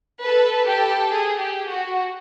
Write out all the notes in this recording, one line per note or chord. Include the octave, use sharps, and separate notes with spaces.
A4 B4
G4 A4
G#4
G4
F#4